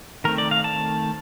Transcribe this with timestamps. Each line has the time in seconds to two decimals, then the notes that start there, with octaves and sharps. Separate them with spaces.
0.24 D#3 A3 C4 A#4
0.38 D5
0.51 F5
0.64 A5